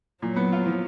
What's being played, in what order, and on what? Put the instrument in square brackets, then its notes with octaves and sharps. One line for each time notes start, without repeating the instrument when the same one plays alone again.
[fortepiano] A#2 [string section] F#3
[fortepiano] B3
F4
F3